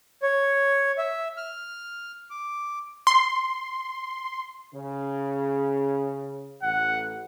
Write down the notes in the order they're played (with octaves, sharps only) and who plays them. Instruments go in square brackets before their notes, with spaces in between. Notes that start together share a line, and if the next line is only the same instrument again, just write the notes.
[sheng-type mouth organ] C#5
E5
F6
D6
[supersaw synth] C6
[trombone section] C#3
[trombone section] A1 [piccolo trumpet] F#5